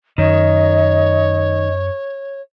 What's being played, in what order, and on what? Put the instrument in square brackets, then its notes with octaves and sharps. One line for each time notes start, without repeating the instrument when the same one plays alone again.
[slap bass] F#2 [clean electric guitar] D#3 [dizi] C#5 [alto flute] D#5